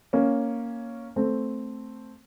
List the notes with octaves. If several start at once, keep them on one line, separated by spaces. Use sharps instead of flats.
A#3 C#4
A3 C4